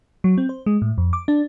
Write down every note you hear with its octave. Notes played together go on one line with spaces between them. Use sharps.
F#3
C4
C5
G#3
A2
F2
D6
D4